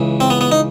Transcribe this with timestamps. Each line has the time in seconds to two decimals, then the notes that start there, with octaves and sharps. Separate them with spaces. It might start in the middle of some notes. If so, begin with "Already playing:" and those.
Already playing: C#2 C#3 E3
0.20 C4
0.30 B3
0.41 B3
0.52 D#4